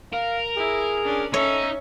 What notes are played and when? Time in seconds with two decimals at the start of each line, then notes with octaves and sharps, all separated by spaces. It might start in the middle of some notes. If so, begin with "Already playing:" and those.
0.13 A#4 F5
0.57 E4 G#4
1.04 C#4 D4
1.34 C#4 D#4 A4 C#5 E5